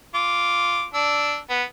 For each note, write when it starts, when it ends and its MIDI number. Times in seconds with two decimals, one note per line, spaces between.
0.15 0.86 65
0.15 0.86 86
0.94 1.37 62
0.94 1.37 88
1.50 1.64 59